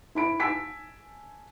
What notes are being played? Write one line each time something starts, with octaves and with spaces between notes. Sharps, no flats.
E4 B5 D7
G#5 A5 E6 B6 D7